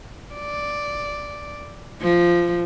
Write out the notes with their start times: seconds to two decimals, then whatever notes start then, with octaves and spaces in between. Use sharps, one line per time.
0.35 D5
2.01 F3